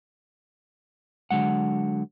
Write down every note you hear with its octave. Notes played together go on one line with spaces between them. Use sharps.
D3 F#3 G#3 F#5